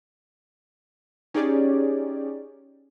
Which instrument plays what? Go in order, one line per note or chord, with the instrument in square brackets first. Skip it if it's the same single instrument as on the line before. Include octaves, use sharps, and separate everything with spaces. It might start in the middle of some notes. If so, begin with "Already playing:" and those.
[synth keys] C#4 D#4 G4 G#4 C#5 D5